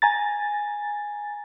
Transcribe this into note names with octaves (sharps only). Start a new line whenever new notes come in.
G#5 A#5 A6